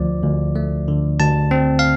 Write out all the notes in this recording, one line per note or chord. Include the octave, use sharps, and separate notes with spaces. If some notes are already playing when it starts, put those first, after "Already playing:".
Already playing: D2 F3 D5
D2
A3
D3
D2 A5
C4
F5